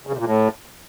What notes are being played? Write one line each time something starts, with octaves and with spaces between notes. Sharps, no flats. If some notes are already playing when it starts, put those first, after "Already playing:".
C#3
C3
A#2
A2